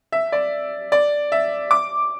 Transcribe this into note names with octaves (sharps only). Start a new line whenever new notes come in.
E5
D5
D5
E5
D6